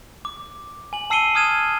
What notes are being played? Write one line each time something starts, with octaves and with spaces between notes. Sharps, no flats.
D6
G#5 F#7
A5 E6 C7 C#7 D#7 G7
D#6 F6 G#6 D#7 E7